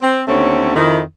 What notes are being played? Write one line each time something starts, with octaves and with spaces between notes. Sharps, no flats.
C4
D#2 D3 A3 C4 C#4 C#5
F2 D#3 E4